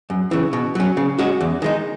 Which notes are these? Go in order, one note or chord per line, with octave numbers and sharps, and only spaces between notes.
F#2
C#3 E3
B2
F#3 C#4
C#3
G#3 C#4 F#4
E2
D#3 G#3 D#4